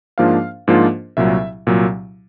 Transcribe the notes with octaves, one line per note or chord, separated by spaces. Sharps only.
G#2 F3 A#3 D4 F4 F5
G#2 F3 A#3 D4 F4
C2 A#2 F#3 E5
C2 A#2 F#3